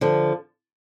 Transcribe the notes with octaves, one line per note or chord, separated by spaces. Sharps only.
D3 F3